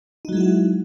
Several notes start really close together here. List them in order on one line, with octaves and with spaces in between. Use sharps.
D#4 F#3 G#3 E4 F#4